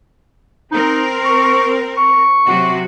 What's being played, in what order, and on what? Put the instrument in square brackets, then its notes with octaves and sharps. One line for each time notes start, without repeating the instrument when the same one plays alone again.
[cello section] C4 A#4 [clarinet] D#4
[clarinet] C#6
C#6
[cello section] C3 F#3 F#4